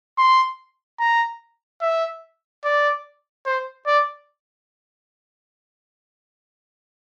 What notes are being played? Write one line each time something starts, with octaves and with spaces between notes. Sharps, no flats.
C6
A#5
E5
D5
C5
D5